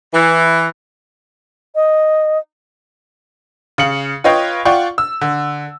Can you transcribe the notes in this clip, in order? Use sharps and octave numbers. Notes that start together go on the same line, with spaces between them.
E3
D#5
C#3 F5 C#7 F#7
F4 B4 C#5 D#5 F5 G5
F4 D5 F#5 G5 C#6
E6
D3